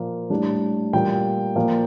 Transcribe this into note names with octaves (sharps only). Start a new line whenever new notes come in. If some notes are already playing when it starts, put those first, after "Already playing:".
Already playing: A#2 F3 A#3
A2 G3 D4
A#2 G3 A#3 G5
A#2 F3 A#3